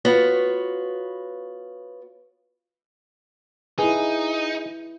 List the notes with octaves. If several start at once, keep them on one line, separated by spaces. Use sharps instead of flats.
B3 F4 F#4 C#5
D#4 E4 G#4 B4